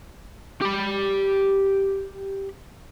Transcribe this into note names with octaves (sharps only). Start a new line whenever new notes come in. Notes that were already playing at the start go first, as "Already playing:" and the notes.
G4 B5